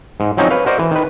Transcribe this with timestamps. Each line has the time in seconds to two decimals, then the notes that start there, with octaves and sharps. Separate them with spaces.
0.20 G#2
0.37 F3 F#3 C4 C#4 D#4
0.50 B4 C#5 F5
0.66 F#4 A#4 C5 D5 D#5
0.79 E3
0.91 D#3 B4